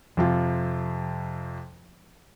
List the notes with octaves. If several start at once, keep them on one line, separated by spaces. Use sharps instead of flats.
F2 C3 F3 F4